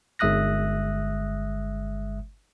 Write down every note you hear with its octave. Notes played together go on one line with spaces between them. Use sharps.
G1 G#3 E5 D#6 F#6 A#6